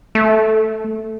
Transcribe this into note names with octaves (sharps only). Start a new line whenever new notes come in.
A3